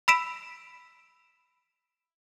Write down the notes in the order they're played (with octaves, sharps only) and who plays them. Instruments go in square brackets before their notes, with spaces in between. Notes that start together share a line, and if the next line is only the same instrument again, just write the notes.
[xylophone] B5 E6 B6 D7 E7